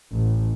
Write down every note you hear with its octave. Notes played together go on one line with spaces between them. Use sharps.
A1